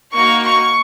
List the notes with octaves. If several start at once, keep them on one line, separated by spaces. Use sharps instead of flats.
A#3 D#4 F#4 C#6
C#6